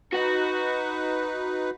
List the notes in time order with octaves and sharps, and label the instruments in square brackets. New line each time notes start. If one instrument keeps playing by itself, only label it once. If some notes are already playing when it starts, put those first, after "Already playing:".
[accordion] D#4 B4 [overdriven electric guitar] F#4 F#5